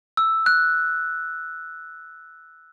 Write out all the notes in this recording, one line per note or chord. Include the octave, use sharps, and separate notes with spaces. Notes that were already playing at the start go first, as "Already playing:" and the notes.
E6
F#6